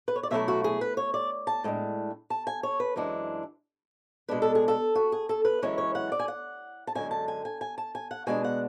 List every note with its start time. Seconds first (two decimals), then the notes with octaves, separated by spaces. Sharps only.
0.08 B4
0.16 C#5
0.23 D5
0.31 B2 F#3 A3 E4 E5
0.48 F#4
0.64 G#4
0.81 B4
0.97 C#5
1.14 D5
1.47 A5
1.64 A2 G#3 D4
2.30 A5
2.47 G#5
2.63 C#5
2.80 B4
2.96 F#2 E3 G#3 D4
4.29 B2 G#3 D4 B4
4.42 A4
4.55 G#4
4.68 A4
4.95 F#4
5.12 G#4
5.29 A4
5.45 B4
5.62 F#2 E3 G#3 C#4 E4 C#5
5.78 C#5
5.95 F#5
6.12 D5
6.19 G#5
6.28 F#5
6.87 A5
6.95 F#2 D3 G#3 G#5
7.11 A5
7.28 G#5
7.45 G#5
7.61 G#5
7.78 A5
7.95 G#5
8.11 F#5
8.27 B2 G#3 D4 G#5
8.44 F#5